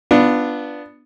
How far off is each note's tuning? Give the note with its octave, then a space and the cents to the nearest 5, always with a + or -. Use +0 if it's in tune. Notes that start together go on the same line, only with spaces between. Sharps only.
B3 +0 D4 +0 F4 -20